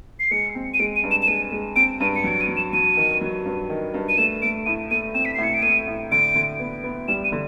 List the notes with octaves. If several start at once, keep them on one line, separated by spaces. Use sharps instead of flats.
C7
G#3 C#7
C4
D#7
G#3 D7
D#7
G2
E7
E7
G#3 D#7
G#3
C4 D7
G2 D#7
C#7
F#3 D7
D#7
F#3
E7
F#3 D#7
D#3
F#3
G2
D#3
G2
D#7
A3 E7
A3 D7
A2 D#7
A3 D#7
C4 E7
B6
A2 C7
C#7
D7
A3 D#7
A2
D3 D7
D3
B3
B3
G3 E7
D#7
D3